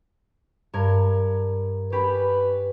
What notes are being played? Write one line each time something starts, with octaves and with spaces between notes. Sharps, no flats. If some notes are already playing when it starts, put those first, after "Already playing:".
G2 A#4 G#6
C#4 G4 B4 B5